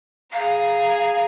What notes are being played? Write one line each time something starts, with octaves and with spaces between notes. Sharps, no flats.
G#4 F5 A#5